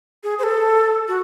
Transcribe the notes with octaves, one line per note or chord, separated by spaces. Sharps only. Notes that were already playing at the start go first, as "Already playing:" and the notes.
G#4
C5
A4
F#4